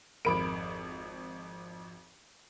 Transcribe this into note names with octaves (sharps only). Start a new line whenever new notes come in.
G#1 F2 A#4 B5 D7